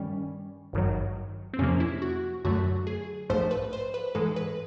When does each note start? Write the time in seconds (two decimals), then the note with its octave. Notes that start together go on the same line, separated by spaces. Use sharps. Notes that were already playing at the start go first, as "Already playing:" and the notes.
Already playing: G2 D#3 G3 C#4
0.73 G#1 G2 D#3 F#3
1.53 C4
1.59 F2 C3 F3 A#3 C#4
1.80 E4
2.02 F#4
2.44 F#2 D3 F#3 A3 F#4
2.87 G#4
3.30 A#1 G#2 F3 A3 C5
3.51 B4
3.73 C5
3.94 B4
4.15 G#2 E3 G#3 A4
4.36 B4